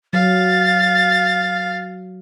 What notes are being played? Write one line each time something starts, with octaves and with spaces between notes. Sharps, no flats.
F#3 F5 A6